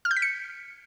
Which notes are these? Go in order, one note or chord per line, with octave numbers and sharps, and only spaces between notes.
F6
G6
B6
C#7